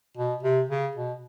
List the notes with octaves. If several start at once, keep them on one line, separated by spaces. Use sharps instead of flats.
B2
C3
C#3
B2